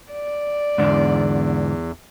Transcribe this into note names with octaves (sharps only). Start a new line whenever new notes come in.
D5
E2 G#2 D3